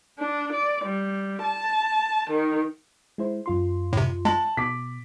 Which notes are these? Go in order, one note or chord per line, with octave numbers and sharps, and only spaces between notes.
D4
D5
G3
A5
D#3
G#3 E4 C5
F#2 F4 C6
A2 C3
G#3 A5 F#7
B2 D6 B6